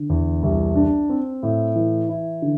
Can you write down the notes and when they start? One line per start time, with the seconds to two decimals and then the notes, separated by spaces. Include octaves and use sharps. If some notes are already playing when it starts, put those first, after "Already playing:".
Already playing: D3
0.10 E2
0.43 C2
0.75 D4
1.09 C4
1.43 A2
1.76 E3
2.09 E4
2.42 D3